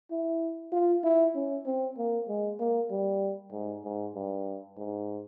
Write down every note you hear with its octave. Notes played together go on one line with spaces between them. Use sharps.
E4
F4
E4
C#4
C4
A#3
G#3
A#3
G3
G#2
G#2
G2
G#2